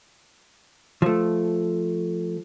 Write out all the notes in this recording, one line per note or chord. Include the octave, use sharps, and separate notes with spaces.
F3 A3